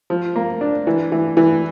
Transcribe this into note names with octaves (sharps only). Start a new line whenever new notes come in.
F3
A#3
D4
E3
E3
E3